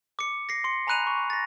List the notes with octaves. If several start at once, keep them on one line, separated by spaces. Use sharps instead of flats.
D6 C#7
A#6 C7
C6 C#7
G#5 A#5 B5 F#6 D#7 F7
C#6
A6 A#6